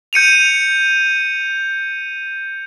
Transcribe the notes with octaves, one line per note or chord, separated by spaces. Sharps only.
G6 C#7 D#7 F7